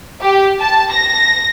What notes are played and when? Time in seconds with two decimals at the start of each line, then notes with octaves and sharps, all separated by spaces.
0.23 G4
0.61 A5
0.91 A#6